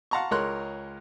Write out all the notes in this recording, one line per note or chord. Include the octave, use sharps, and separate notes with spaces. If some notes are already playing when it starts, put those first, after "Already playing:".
F5 F#5 A5 A#5 C6 C#6
C#2 G#3 A#4 C#5 C6 F#6